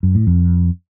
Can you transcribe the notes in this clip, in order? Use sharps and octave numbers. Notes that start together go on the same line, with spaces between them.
F#2
A2
F2